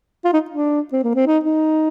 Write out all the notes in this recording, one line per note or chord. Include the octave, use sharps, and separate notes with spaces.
F4
D#4
D4
C4
A#3
C4
D#4
D#4